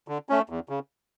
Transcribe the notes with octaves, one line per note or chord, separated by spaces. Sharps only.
D3
A3 C#4
E2
C#3